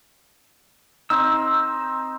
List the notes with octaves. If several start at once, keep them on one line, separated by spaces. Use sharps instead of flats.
C4 D#4 E6